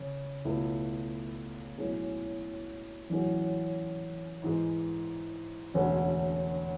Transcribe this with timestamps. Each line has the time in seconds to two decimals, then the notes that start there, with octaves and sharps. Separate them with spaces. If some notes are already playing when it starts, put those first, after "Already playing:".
Already playing: C#3 C#4
0.45 C#2 B2 A3 E4
1.78 B1 A2 G#3 C#4 G#4
3.10 A1 A2 F#3 C#4 G#4
4.42 G#2 E3 G#3
5.74 E1 D2 D3 G#3 C#4